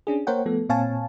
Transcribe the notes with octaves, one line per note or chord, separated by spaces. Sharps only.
C#4 D4 G#4
A#3 A#4 C5 C#5 F#5 G5
F3 A3 B3 A4
A#2 C4 C#5 F5 G#5 A5